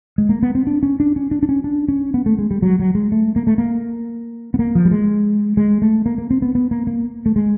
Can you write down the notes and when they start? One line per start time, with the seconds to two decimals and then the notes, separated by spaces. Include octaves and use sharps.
0.18 G#3
0.29 A#3
0.43 B3
0.55 C4
0.67 D4
0.83 C#4
1.00 D4
1.16 C#4
1.31 D4
1.43 D4
1.49 C#4
1.64 D4
1.88 C#4
2.14 B3
2.26 A3
2.39 G#3
2.51 G3
2.62 F#3
2.80 F#3
2.95 G#3
3.12 A3
3.36 A#3
3.47 A3
3.58 A#3
4.54 B3
4.59 A#3
4.75 F3
4.85 G3
4.91 G#3
5.57 G#3
5.82 A3
6.06 A#3
6.18 A#3
6.31 C4
6.42 B3
6.55 B3
6.71 A#3
6.87 A#3
7.26 A3
7.36 G#3